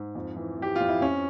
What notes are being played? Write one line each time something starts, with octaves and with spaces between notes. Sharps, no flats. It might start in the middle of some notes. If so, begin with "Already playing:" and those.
Already playing: G#2
F2
E3
E3 G4
F2 F4
E4
F2 C#4